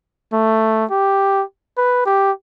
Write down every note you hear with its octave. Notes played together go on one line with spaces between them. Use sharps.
A3
G4
B4
G4